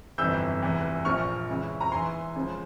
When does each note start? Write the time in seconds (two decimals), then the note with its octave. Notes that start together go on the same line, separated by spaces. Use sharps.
0.18 G1 F2 C3 E3 E6 G6
0.62 F1 E2 E3
1.05 A#1 A#2 F3 C#6 F6
1.49 C#2 C#3 E3
1.80 A#5
1.92 E2 E3 G#5 C6
2.35 C#2 C#3 F3